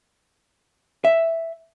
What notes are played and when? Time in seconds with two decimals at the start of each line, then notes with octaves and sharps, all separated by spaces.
1.05 E5